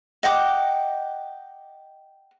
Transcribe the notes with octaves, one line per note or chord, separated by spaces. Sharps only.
D#5 F#5 G5 D6